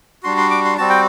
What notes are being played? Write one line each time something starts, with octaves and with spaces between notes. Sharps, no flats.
G3 D4 F#4 C6
C6
D6
C6
G3 C4 F#4 A5
G5